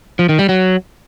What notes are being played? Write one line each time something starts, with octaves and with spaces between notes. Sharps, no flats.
F3
D#3
G3
F#3